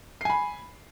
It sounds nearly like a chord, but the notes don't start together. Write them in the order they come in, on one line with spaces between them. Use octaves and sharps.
C7 G#5 B5